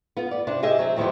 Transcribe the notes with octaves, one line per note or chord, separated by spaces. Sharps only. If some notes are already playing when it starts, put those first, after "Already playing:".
B3 F4
D5
C3 D4
G4 G#4 D#5 E5
F#3 C4
D2 D#3 F3 B3 E4 G4